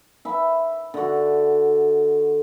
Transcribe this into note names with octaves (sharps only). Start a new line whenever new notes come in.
E5 B5
D3 F#4